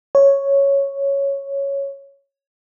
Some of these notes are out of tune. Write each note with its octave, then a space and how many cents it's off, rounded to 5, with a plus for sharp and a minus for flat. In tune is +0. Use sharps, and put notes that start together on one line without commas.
C#5 +0